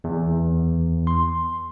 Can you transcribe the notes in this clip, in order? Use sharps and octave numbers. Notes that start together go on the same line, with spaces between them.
E2
C6